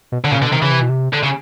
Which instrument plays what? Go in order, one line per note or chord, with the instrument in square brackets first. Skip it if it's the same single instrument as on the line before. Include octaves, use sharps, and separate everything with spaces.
[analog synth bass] B2
[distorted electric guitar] D3
[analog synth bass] A#2 [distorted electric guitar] C#3
[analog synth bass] B2 [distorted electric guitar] D3
[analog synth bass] C3 [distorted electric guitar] D#3
[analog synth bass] C#3 [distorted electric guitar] E3
[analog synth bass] C3
B2
C3
[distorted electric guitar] D3
C#3